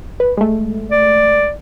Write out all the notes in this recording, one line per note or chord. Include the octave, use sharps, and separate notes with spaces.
B4
G#3 A3
D5